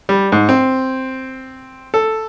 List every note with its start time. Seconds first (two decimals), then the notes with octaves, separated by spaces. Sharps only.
0.09 G3
0.32 G#2
0.49 C4
1.94 A4